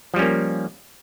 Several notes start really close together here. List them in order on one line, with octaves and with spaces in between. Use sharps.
F3 G3 C#4 A#3